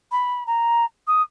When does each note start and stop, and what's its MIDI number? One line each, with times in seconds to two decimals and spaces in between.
0.11 0.43 83
0.46 0.84 82
1.07 1.22 87